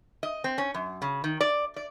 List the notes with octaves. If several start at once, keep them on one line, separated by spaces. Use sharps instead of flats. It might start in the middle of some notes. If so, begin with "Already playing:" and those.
D#5
C4
C#4
F#2
C#3
D#3
D5
D5